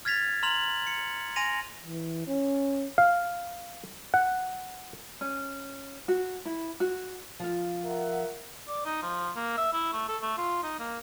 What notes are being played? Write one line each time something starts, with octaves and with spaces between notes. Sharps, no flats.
F6 G#6 A6 B6 F7
A#5 C6 F6 F7 F#7
C#7
G#5 C6 A#6 D#7 F7
E3
C#4
F5
F#5
C#4
F#4
E4
F#4
F3 F5
A#4 E5 F#5
D5
D#4
F3
A#3
E5
E4
A3
A4
A3
F4
D#4
A#3